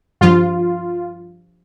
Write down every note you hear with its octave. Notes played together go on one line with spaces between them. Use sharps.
G2 F3 F4